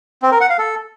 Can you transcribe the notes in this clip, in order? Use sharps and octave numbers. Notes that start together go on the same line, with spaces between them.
C4
A#4
F#5
F5
A4